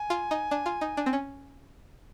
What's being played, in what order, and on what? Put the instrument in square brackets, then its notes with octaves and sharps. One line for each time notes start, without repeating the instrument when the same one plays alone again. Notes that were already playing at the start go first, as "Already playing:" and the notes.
Already playing: [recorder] G#5
[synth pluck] F4
D#4
D4
F4
D#4
D4
C4
C#4